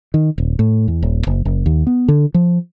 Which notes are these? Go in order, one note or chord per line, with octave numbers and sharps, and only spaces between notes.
D#3
D#1
A2
E2
D#1
F#1
F#1
D#2
B3
D3
F3